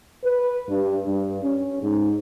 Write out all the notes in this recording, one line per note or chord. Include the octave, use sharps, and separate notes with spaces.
B4
G2
G2
C#4
G#2